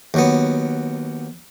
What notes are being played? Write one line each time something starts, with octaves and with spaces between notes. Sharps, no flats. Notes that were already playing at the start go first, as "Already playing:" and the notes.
D#2 F#3 B3